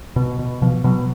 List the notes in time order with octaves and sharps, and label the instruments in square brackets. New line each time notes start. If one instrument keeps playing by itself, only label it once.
[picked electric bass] B2
B2
B2 F3
B2 F#3